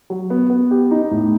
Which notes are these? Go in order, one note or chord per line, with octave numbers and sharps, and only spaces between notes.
F#3
B3
B3
G4
D#4
A2